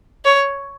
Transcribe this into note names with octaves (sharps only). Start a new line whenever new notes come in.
C#5